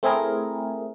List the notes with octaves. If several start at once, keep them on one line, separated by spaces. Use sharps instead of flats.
A3 C4 E4 G#4 A#4